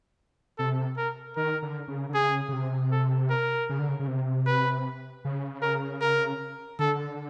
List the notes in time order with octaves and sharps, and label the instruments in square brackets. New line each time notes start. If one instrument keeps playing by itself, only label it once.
[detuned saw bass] C3 [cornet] A4
[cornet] A#4
[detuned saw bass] D#3 [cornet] A#4
[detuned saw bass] D3
C#3
D3
[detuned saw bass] C#3 [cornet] G#4
[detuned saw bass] C#3
C3
[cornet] A4
A#4
[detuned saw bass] C#3
D3
C#3
C#3
C3
[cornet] B4
[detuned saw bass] C#3
[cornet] A#4
A#4
[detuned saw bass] D3 [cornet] A4